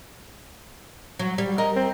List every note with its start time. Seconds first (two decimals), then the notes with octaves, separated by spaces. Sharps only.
1.19 F#3
1.38 G3
1.58 A#4 D#5
1.76 C4